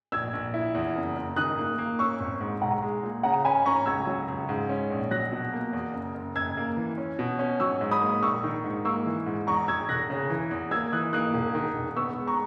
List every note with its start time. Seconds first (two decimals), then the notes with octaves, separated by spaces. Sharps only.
0.12 A#1 E6 G#6
0.33 A#1
0.54 E4
0.75 E2
0.95 F#1
1.16 F#1
1.36 D#3 D#6 F#6
1.58 A#3
1.78 A#3
1.99 C#4 C#6 E6
2.20 G#1
2.40 G#2
2.61 B1 F#5 A#5
2.82 G#3
3.03 A#2
3.23 C#3 F#5 A#5
3.45 C#4 G#5 B5
3.65 C#4 A#5 C#6
3.86 C#2 E6 G#6
4.07 F#3
4.28 C#2
4.49 G#2
4.69 C#4
4.90 A#1
5.11 F#3 F#6 A#6
5.32 B2
5.53 A#3
5.73 E2
5.94 F#1
6.14 F#1
6.35 F#1 E6 G#6
6.57 A#3
6.77 E3
6.98 C#4
7.19 B2
7.39 C#4
7.60 F#3 C#6 E6
7.81 G#2
7.91 B5 D#6
8.01 A#3
8.23 A#1 C#6 E6
8.44 D#3
8.64 G#2
8.85 A#3 C#6 E6
9.06 E3
9.26 G#2
9.47 E2 A#5 C#6
9.68 E2 E6 G#6
9.89 E1 F#6 A#6
10.10 C#3
10.30 E3
10.51 E2
10.71 A#3 E6 G#6
10.92 E3 D#6 F#6
11.13 A#3 D#6 F#6
11.34 E1
11.55 D#3
11.76 E1
11.96 B3 C#6 E6
12.17 G#3
12.27 A#5 C#6